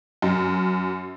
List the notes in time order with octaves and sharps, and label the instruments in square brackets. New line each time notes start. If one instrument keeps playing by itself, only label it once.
[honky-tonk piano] F#2